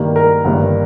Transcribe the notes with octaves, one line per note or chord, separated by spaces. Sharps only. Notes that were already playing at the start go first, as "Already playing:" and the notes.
Already playing: G2 D#3 A#3
A#4
G1 G2 D#3 A#3